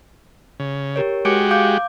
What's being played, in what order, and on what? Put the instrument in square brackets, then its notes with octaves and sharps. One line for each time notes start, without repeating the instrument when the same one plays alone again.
[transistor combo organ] C#3
[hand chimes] G4 A#4 C#5
[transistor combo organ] G#3 F#4 G4 [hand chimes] D6 C#7 D7
[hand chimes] F5 D6 G6